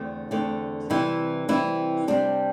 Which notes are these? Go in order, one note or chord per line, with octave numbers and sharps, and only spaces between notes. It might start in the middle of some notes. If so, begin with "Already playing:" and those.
Already playing: E2 D3 A3 C4
E2 D3 A3 C4
C3 E3 G3 C4 E4
C3 E3 G3 C4 E4
C3 G3 C4 D4